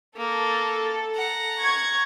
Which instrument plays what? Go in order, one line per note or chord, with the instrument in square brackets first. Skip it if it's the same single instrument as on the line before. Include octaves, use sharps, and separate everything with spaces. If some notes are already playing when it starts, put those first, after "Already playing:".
[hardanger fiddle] A#3 [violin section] A4
[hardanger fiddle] F#5 A#5
[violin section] C#6 G#6